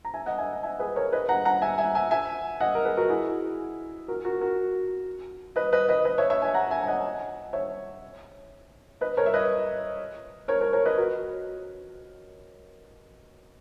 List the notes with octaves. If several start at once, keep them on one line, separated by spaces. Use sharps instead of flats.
A#5
E5 G#5
D#5 F#5
E5 G#5
E5 G#5
G#4 B4
A#4 C#5
B4 D#5
F#5 A#5
F#5 A#5
E5 G#5
E5 G#5
E5 G#5
E5 G#5
D#5 F#5
A#4
G#4 B4
F#4 A#4
E4 G#4
F#4 A#4
F#4 A#4
F#4 A#4
B4 D#5
B4 D#5
B4 D#5
B4 D#5
C#5 E5
C#5 E5
E5 G#5
F#5 A#5
E5 G#5
G#5
D#5 F#5
C#5 E5
B4 D#5
A#4 C#5
E5
B4 D#5
A#4 C#5
A#4 C#5
A#4 C#5
B4 D#5
F#4 A#4